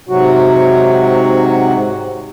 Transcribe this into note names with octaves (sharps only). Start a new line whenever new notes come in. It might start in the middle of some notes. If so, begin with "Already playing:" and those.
G#2 C3 F#3 F#4